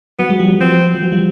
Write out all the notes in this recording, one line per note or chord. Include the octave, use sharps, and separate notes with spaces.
F#3 B3
F#3 G#3
F3 G3
F#3
F3 C4
F3
F#3
F3 G3